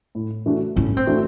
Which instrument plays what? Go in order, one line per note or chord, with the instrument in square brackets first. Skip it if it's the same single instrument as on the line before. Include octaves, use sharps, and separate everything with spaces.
[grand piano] A2
E3 A3 D4 F#4
[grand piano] A2 [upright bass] C#4
[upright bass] C4
[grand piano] E3 A3 D4 F#4